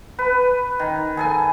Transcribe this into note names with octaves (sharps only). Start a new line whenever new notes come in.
B4
D#3
G#4 A4 G#5